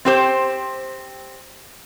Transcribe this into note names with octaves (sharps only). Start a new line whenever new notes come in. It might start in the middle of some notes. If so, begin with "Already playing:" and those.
C4 G4 C5